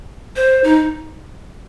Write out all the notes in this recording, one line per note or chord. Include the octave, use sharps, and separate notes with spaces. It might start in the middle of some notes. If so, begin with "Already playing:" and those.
C5
D#4